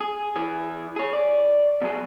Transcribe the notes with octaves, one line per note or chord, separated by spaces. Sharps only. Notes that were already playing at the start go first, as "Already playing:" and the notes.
G#4
E3 G#4
G#4 C#5
D5
B2 F#3 G#4